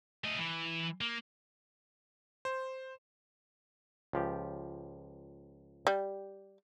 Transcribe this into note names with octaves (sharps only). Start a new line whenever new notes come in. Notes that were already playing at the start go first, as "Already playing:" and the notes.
A3 D#5
E3
A#3
C5
C#2 F3 G4
G3